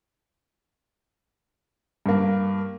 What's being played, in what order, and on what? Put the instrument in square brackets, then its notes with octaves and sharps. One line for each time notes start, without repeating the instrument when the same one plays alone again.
[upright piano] G2 A#3